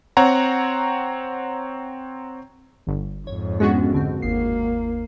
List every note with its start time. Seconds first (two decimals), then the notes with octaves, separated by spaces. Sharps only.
0.17 C4 C#5 F#5 A#5
2.87 G1
3.27 F2 G#2 C#5
3.60 G#3 B3 C#4 D4 F#4
3.92 C#2 D3 C4
4.22 G1 D#2 A#3 C7